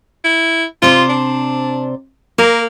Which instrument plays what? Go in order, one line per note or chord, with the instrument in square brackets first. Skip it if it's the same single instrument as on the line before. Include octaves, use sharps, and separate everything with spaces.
[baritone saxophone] E4
[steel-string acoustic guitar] C3 C5 D5 [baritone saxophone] F4
[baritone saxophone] D4
[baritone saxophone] A#3 [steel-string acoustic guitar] A#4